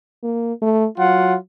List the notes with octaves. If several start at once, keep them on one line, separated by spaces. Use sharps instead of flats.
A#3
A3
F#3 F4 F#5